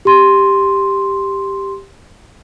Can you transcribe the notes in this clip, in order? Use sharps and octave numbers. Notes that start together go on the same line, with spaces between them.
G4 C6